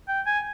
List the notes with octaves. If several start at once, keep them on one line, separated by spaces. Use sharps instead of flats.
G5
G#5